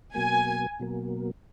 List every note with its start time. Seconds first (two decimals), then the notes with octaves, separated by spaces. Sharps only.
0.14 B2 F#3 A#3 G#5
0.80 B2 F#3 A#3